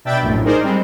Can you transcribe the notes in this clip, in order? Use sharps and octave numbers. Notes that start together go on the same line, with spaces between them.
B2 D4 E5 G5 B5 A6
A#1 F#2 A2
D#4 G#4 A#4 C5 D5
G3 G#3 C4